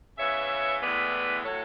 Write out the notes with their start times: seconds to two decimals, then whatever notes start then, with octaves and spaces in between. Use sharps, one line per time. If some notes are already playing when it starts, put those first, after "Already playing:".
0.18 C#3 E3 B3 C#5 E5
0.81 A2 E3 G#3 B3 B4 D5
1.44 A2 F#3 A3 A4 C#5